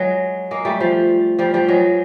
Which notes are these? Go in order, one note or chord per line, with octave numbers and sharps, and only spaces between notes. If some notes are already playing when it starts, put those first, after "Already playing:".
Already playing: F#3 G#3
G#3 A#3
G3 A3
F3 G3
F3 G3
F3 G3
F#3 G#3